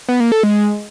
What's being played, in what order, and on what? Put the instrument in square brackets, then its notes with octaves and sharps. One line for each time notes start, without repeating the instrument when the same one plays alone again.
[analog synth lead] B3
A#3
A4
G#3